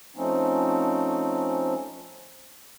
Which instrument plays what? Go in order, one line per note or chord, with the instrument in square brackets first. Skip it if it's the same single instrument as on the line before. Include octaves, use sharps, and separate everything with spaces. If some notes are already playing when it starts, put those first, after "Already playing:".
[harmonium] F3 A3 C4 C#4 D#4